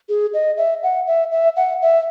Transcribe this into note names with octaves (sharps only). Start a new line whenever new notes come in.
G#4
D#5
E5
F#5
E5
E5
F#5
E5